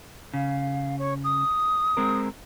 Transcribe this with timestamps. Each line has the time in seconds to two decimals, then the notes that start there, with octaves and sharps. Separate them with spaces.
0.33 C#3 F5
0.99 C#5
1.24 D#6
1.97 G#3 C4 A#4